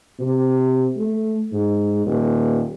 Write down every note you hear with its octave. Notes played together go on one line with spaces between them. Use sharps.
C3
A3
G#2
D#1